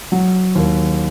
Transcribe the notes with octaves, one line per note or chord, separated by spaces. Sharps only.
F#3
D#2